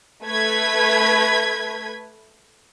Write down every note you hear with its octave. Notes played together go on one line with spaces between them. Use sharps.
A3 B4 G#6 B6